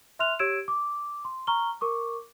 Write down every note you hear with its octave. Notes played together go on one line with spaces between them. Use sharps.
E5 C6 F6 F#6 F7
G4 C#5 E6 G#6 D7 E7
D6
C6
A#5 C#6 F6 G7
A#4 C#6 D6